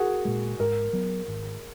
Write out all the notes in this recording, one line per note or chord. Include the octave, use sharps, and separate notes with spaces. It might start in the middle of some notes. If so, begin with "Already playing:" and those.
Already playing: F#4 G#4 A#4
A#2 G#3
G#2 A#4
F#3 B3
G#1